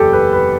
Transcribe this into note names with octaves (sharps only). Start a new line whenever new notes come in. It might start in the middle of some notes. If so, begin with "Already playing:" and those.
Already playing: F#1 E2 G4 A4
B4
B4